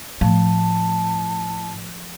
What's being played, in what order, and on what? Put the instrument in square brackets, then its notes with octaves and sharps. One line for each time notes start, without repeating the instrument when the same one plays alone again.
[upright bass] A2 [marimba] F3 [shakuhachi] A5